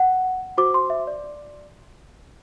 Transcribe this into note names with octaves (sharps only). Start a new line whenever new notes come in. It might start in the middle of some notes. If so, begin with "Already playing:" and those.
Already playing: F#5
F#4 C5 D6
C6
E5
D5